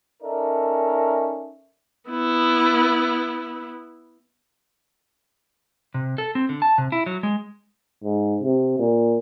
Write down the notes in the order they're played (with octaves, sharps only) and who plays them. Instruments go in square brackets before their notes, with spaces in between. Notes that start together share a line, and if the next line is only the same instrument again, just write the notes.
[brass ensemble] C#4 D#4 A4 A#4 D5 E5
[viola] B3 E4
[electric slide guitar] C3
A4
C4
D3
A5
C3
E4
F#3
G#3
[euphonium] G#2
C3
A#2